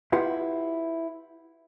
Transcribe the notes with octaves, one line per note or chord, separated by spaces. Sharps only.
E4 F4 G4 B4 F#5